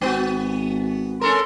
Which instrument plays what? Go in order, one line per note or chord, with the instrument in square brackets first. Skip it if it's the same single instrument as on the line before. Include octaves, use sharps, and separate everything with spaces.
[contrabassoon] G#1 [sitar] B3 F#4
[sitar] C#4 A4 A#4 [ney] C6